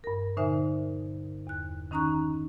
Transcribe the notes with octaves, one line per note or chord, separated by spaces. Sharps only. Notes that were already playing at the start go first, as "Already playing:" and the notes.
G2 A#4
A#2 D3 D#4 C5 E5 G#5
E2 F#6
D#3 C#4 D#4 A#5 C#6 F#6